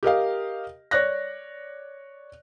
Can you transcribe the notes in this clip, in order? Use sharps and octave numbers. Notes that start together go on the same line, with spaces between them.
G4 A#4 D#5 F5
C#5 D5 F#6 A#6